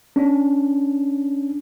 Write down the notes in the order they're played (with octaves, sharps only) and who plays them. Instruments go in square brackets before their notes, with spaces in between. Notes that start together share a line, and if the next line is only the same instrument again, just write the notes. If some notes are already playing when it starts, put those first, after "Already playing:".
[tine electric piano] C#4 D4